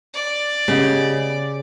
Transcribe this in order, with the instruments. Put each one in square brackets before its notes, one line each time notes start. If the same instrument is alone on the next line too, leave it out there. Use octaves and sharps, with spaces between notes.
[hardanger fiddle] D5
[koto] C#3 [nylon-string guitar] B3 G4 D#5